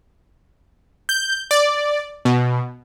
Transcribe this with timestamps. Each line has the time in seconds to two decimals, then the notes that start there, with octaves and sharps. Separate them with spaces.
1.09 G6
1.51 D5
2.25 B2